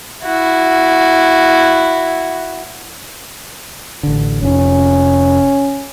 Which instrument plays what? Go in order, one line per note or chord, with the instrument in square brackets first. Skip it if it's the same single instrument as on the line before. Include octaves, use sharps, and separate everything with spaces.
[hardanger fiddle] E4 F#4
[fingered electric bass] A1 D3
[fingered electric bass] F1 [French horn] C#4